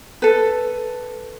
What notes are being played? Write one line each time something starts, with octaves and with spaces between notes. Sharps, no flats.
A4 B4